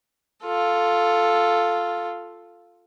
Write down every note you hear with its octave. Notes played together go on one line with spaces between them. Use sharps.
F4 A4